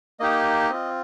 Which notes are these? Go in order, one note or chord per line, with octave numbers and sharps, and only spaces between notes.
A#3 D#4 G4 D#5
C4 F4